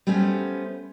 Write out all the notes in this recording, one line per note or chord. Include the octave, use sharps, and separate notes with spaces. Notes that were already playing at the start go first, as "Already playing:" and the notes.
G3 A3 B3 C#4 C5